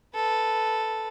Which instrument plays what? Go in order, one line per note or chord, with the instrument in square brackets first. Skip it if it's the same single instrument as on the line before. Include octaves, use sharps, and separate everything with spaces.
[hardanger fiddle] A4 B4